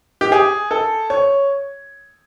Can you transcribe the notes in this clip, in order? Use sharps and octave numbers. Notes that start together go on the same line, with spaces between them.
G4
G#4
A4
C#5